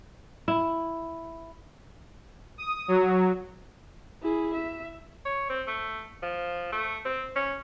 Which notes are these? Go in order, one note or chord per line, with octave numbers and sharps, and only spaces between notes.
E4
D#6
F#3
E4 G#4
E5
C#5
C4
A3
F3
A3
C4
C#4